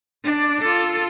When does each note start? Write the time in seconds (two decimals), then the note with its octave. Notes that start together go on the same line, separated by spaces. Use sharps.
0.24 D4 D5
0.62 F4 A4